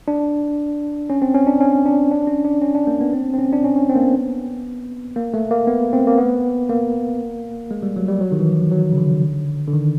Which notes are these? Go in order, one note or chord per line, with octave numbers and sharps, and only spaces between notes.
D4
C#4
C4
C#4
D4
C#4
D4
D4
C#4
D4
C#4
D4
A#3
B3
C4
C4
C#4
D4
C#4
C#4
C4
A#3
B3
A#3
A3
A#3
B3
C4
A#3
B3
A#3
G#3
G3
F#3
G3
F#3
D#3
E3
F3
F#3
C#3
D3
D3
D#3